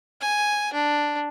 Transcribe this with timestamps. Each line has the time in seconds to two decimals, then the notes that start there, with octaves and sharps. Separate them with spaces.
0.21 G#5
0.73 D4